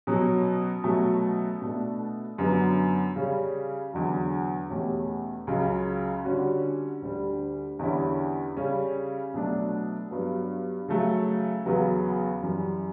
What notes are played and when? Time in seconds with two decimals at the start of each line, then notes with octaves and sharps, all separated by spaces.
0.07 B2 F#3 C#4
0.84 B2 F#3 A3 C#4
1.62 B2 A3 D4 A4
2.38 F#2 D3 F#3 B3
3.16 C#3 G3 C#4
3.94 E2 D3 F#3
4.70 E2 B2 A3 C#4 G4
5.47 C#2 C#3 F#3
6.25 D3 G3 C#4 F#4
7.02 D2 D3 G3
7.79 E2 D3 G3 C#4 E4
8.57 C#3 G3 C#4
9.34 B2 F#3 A3 D4
10.11 G2 F#3 B3
10.88 C#3 F#3 A3
11.66 E2 C#3 F#3 B3
12.43 F#2 E3 G3